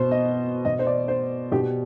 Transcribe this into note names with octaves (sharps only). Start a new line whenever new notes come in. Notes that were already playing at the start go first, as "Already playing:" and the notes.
Already playing: B2 C5
D#5
B2 D#5
C5
D5
C5
B2 G4